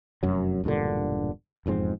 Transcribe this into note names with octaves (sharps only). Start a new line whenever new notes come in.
F1 F#2 F#3
E1 G2 A#2 D3
E1 F2 G#2 C4